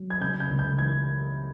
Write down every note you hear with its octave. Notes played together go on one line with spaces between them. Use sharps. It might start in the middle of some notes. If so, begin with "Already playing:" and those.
Already playing: F#3
G#6
C#3 G6
G6
C#2
G6
E3 G#6